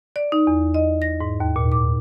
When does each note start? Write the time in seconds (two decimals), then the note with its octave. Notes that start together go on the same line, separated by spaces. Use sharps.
0.16 D5
0.32 D#4
0.47 E2
0.74 D#5
1.02 A#6
1.21 G#2
1.40 D#2
1.56 A#2
1.72 D6